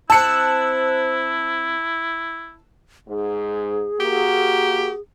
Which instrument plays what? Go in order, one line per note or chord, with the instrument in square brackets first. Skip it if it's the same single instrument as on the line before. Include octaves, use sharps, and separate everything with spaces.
[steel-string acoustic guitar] C4 C5 [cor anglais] E4 [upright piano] A5 C#7 [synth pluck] E6 F#6
[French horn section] G#2 [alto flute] G#4
[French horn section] A#3 F#4 [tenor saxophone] G4